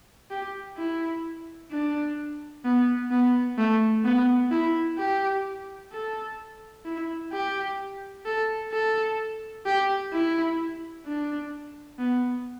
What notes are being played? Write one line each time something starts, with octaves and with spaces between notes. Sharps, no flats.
G4
E4
D4
B3
B3
A3
B3
E4
G4
A4
E4
G4
A4
A4
G4
E4
D4
B3